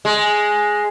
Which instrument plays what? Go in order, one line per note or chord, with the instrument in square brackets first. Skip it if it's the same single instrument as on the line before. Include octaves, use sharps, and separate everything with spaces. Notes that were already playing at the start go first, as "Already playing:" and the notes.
[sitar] G#3